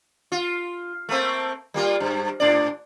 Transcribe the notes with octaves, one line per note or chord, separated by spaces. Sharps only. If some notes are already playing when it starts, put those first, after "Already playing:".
F4
A3 A#3 C4
G3 A#3 F4
G2
A2 D4 D5